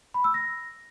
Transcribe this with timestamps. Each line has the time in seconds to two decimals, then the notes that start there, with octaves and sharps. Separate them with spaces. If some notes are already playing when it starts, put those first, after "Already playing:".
0.14 B5
0.24 E6
0.34 A#6